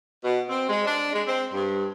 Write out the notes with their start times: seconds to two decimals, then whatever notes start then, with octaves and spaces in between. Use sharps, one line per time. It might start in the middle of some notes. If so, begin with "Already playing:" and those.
0.24 B2
0.49 C4
0.69 G#3
0.86 D4
1.13 G#3
1.27 C4
1.53 G2